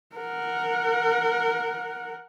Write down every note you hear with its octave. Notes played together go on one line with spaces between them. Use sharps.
A#4 F#5